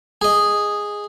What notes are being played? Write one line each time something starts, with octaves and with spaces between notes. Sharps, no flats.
G#4 D#5